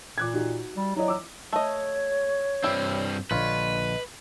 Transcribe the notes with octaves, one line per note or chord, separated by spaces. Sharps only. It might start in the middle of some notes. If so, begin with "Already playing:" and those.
A#2 D6 F#6 G#6
D#4 F#4 G4
G3
F#3 E4 D5 D#5
D6 E6
A3 C#5 D#5
G2 G3 C4 E4
A#1 D3 F4 B4 C#5 D#5